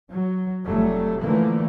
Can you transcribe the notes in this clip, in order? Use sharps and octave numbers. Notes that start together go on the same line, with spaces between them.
F#3
F1 F#3 G3 A3
D3 E3 F3 A3 A#3